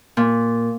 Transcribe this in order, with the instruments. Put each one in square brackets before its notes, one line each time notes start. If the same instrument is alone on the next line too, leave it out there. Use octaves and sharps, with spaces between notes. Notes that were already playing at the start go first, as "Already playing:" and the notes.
[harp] A#2